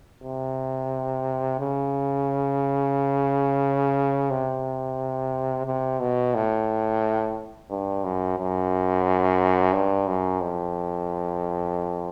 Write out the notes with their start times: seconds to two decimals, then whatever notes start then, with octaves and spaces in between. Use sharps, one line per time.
0.24 C3
1.60 C#3
4.31 C3
5.67 C3
6.00 B2
6.34 A2
7.70 G2
8.04 F#2
8.38 F#2
9.73 G2
10.07 F#2
10.41 F2